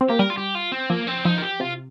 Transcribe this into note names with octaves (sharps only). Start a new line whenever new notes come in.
C4
A#3 G4
G3 A#4
F4
G4
F4
C4
F3 A#3
C4
F3 D#4
A#4
G4
C3 F4